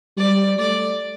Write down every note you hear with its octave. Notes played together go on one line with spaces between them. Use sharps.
G3 D5
A3 D5